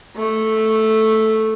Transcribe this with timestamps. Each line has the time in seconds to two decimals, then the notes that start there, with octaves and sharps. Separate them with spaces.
0.17 A3